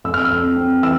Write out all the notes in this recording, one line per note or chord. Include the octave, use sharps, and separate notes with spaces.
F2 E6
F6
E6
F2
C4
E3 E6